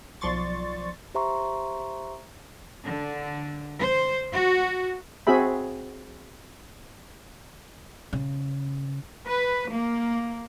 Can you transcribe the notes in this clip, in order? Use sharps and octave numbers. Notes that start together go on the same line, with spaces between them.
B1 F3 D5 C6 C#6 A6
G4 C5 E5 A#5 C6 C#6
D3
C5
F#4
C4 F#4 G#4 E5 B5
C#3
B4
A#3